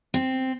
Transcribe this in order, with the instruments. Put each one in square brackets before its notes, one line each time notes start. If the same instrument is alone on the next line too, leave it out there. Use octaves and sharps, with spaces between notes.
[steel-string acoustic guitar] C4